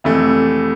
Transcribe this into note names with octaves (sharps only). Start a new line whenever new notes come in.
F1 F2 E3 A3